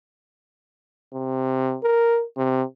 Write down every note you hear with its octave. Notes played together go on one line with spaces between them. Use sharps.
C3
A#4
C3